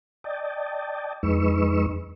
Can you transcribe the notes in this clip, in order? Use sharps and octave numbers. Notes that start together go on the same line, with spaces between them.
D5 D#5 G5 A5
F2 G#3 D#4 B4 C#6 E6